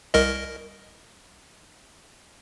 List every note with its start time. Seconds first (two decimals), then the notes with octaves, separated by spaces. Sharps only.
0.14 C2 A#4 D#5